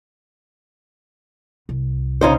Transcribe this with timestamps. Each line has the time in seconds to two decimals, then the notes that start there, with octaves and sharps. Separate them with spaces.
1.69 C2
2.21 C#3 D#4 C5